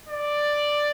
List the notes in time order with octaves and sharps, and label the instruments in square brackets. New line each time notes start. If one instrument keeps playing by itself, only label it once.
[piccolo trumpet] D5